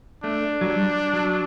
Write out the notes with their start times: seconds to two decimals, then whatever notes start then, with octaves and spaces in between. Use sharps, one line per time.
0.24 A3 D4
0.61 F#3
0.69 G3
1.13 F#3